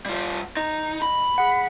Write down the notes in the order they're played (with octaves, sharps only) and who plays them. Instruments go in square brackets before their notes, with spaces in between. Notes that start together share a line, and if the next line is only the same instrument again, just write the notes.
[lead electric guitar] G3 F4
[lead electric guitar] D#4 [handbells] D#5
[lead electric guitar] B5
[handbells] G#4 F#5